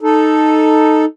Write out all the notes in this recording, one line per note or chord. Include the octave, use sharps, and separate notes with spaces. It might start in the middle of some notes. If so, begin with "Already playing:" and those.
D#4 A4